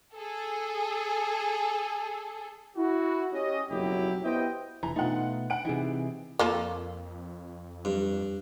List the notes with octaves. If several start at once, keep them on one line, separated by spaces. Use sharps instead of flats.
G#4 A4
E4 F#4
C#4 G4 D#5
F#1 B1 F2 F#3 E4 G4
B3 E4 G4 C5 D#5 G5
F1 E3 A#5
B2 A3 D#4 F4 F#5
F#5 D7
C3 E3 D#4 G#4
F2 A#3 F4 A4
G2